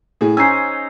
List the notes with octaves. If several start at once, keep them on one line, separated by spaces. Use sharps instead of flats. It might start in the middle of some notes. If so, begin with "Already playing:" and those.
A2 G#4
C#4 D#4 C5 G#5 E6 G#6 C7